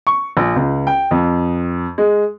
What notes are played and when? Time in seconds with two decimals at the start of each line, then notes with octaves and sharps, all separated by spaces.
0.07 C#6
0.37 A#1
0.56 C#2
0.87 G5
1.11 F2
1.98 G#3